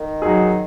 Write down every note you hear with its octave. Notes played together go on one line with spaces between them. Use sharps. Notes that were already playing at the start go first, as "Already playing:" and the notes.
Already playing: D#3
F#3 D#4 G#4